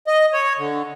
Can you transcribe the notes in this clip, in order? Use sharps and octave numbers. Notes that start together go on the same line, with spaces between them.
D#5
C#5
D3